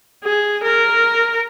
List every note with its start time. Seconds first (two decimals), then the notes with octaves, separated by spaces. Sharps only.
0.24 G#4
0.64 A#4